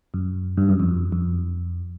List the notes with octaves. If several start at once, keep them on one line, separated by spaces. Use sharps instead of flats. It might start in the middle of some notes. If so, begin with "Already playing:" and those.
F#2
G2
F#2
F2
F2